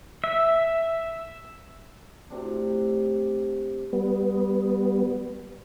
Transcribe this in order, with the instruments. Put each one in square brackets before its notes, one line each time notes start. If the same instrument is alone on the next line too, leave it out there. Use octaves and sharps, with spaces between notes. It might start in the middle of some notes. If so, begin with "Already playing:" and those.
[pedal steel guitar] E5
[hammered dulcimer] A2 C3 D4
[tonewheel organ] G3 B3